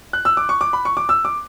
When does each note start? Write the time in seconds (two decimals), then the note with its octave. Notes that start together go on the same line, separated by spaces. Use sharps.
0.13 F#6
0.25 E6
0.37 D6
0.49 C#6
0.61 D6
0.73 B5
0.85 C#6
0.97 D6
1.09 E6
1.25 D6